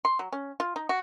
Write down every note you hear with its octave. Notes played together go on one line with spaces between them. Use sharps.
C6
F#3
C#4
F4
D#4
F#4